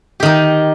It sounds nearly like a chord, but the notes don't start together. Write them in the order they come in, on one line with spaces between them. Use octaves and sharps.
G4 D#3 D#4